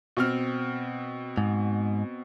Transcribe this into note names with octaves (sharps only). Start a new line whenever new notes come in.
B2 C4 F6
G#2